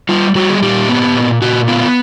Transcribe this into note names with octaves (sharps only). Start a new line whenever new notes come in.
G3 F4
G3 F#4
G#4
A#2 G4
B3
A#2
A#2 F#4
B3 F4